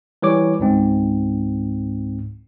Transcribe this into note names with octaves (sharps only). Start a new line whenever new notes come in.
E3 G3 C#5 D6
C#2 G#2 C4